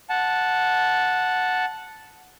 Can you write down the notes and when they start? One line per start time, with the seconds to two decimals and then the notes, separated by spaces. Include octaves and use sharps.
0.10 F#5 A5